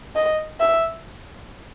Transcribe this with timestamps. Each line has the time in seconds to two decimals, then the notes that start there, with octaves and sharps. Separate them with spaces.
0.15 D#5
0.60 E5